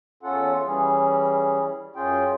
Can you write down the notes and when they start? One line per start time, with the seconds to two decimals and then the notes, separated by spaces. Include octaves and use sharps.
0.23 E2 C#4 F4 A4 F#5
0.65 E3 G3 C#4 G#4
1.96 F#2 C#4 F4 G#4 G5